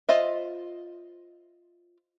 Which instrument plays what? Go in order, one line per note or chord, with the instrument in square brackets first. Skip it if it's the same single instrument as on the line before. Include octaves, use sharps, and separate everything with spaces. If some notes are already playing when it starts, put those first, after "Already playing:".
[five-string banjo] F4 C5 D#5 E5